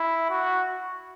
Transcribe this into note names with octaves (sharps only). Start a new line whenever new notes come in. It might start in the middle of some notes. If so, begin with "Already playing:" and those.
Already playing: E4
F#4